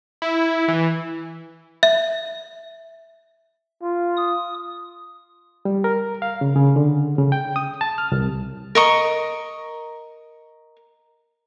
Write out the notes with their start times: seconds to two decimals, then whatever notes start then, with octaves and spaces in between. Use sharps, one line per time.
0.22 E4
0.68 E3
1.83 E5
3.82 F4
4.17 D#6
5.65 G3
5.84 A#4
6.22 F5
6.41 C#3
6.56 C#3
6.76 D3
7.18 C#3
7.32 G5
7.56 D#6
7.81 A5
7.98 F6
8.12 C2
8.75 A#4 D#5 C#6